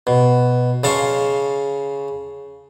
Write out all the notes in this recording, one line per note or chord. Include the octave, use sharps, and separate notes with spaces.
B2
C#3 F5 A5 C6 C#6